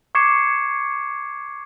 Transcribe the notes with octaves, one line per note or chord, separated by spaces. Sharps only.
C#6 D6 G#6 C7 C#7 E7